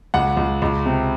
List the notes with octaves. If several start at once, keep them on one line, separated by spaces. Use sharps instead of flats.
C#2 F#5
C#2
C#2
C3